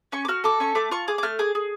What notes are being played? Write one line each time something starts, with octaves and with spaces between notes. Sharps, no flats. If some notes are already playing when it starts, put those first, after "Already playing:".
C#4 C#6
D6
F#4 F6
A4 D6
C#4 C#6
A3 D6
F4 C#6
G#4 D6
D6
A3 F6
G#4 D6
G#4